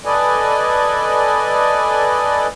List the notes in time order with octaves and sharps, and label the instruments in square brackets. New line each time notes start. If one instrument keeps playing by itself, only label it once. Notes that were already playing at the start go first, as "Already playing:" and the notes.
[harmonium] A4 B4 D5 D#5 G#5